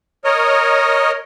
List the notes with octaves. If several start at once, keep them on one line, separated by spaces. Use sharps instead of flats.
A#4 C#5 D#5